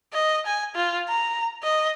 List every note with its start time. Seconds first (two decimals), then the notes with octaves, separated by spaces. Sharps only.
0.13 D#5
0.46 G#5
0.75 F4
1.09 A#5
1.63 D#5